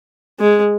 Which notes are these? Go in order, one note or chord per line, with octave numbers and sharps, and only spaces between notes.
G#3